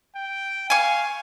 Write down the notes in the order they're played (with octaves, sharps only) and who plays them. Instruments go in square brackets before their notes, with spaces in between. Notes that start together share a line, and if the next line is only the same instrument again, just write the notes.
[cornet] G5
[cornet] F5 [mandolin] G#5 C#6